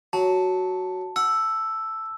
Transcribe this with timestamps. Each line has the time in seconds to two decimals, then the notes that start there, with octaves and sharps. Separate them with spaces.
0.13 F#3 A5
1.16 F#5 E6